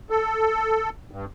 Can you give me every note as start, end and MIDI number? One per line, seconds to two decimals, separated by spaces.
0.10 0.89 69
1.11 1.25 43